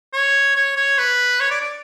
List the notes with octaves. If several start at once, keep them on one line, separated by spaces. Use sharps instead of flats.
C#5
C#5
C#5
B4
C#5
D5
D5